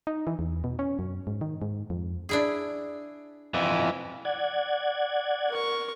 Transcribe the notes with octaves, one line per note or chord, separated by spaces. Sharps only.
D#4
E3
E2
B2
C#4
F#2
G#2
D#3
G#2
F2
D4 E4 G#4
F2 E3
D5 F#5 G#6
A#4 C#6